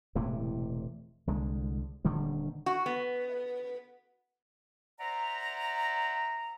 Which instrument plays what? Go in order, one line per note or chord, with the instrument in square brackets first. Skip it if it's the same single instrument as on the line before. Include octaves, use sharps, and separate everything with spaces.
[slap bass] E1 A2 C3 E3
C2 D3 G#3
D#1 D3 D#3 G3
[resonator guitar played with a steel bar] F#4
B3
[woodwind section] C5 D5 E5 F#5 A#5